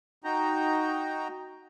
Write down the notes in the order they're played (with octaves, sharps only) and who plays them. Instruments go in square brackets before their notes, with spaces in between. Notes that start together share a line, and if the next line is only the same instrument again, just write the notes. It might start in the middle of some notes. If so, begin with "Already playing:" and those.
[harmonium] D#4 F#4 G5 A#5